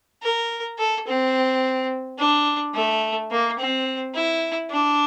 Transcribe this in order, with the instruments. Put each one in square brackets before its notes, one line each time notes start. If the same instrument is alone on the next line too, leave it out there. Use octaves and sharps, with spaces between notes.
[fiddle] A#4
A4
C4
D4
A3
A#3
C4
E4
D4